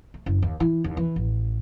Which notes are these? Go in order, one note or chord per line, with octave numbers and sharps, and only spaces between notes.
A3
F#1
D#2
E3
D#2
E3
A1